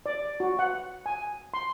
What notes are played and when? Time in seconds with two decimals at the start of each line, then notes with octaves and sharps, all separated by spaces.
0.06 D5
0.40 F#4
0.59 F#5
1.06 G#5
1.54 C6